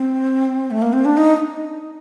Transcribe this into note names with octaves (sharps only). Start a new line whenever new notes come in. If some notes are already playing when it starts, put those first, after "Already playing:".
Already playing: C4
A3
A#3
C4
D4
D#4